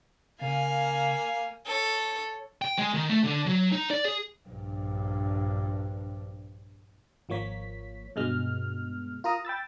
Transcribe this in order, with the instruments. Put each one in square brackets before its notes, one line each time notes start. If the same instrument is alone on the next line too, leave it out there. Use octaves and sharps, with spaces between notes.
[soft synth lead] C#3 [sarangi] A#3 [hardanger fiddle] F5 G#5
[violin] A4 C#5
[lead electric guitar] G5
G#3
D#3
A3
D3
F#3
D#4
D5
G#4
[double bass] A#1 G2
[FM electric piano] G#1 F3 A#3 C#5 B6
G2 B2 G#3 B3 F6
F4 A#4 A#5 D#6
G5 B5 E6 A6